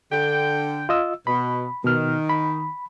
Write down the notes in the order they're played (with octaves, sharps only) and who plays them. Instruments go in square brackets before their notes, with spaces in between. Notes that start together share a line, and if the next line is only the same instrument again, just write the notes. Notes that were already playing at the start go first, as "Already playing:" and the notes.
[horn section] D3 G5
[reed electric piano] F4 D#5 E6
[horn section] B2 [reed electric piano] B5
[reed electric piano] B2 F6 [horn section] D#3
[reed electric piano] B5